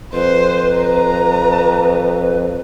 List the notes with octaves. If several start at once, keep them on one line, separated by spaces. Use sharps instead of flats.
F2 B4 C5
A#5